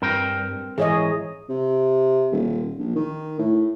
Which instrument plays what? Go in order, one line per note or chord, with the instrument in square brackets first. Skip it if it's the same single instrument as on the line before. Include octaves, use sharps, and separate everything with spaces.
[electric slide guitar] G2 [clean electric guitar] C4 A#4 G5
[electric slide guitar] G#2 E3 [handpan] G#4 C#5 D#5
[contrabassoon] C3
D#1
A#1
D#3
A2